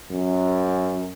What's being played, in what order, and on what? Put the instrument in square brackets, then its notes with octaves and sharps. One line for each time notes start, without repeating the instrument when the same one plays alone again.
[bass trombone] F#2